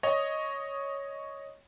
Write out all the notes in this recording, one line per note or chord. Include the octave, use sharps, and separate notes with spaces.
C#5 D#5